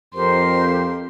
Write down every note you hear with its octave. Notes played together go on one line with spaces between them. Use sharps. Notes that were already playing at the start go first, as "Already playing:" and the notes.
F2 G4 A#4 C5 C6